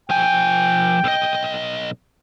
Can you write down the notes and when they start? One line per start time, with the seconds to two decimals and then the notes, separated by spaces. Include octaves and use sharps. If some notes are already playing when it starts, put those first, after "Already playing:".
0.10 F3 G5 G#5
1.04 B1 D#5